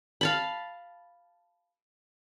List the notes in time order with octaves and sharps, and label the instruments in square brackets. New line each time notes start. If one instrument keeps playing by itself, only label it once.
[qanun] F5 A5 B5